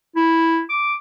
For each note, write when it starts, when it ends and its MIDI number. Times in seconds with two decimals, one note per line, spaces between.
0.16 0.62 64
0.70 0.93 86